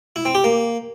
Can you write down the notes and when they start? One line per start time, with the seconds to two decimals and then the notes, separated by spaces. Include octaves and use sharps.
0.16 E4
0.25 C4
0.35 G4
0.44 A#3